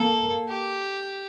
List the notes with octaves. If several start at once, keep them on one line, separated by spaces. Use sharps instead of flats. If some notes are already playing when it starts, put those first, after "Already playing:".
Already playing: A#3 A4
G4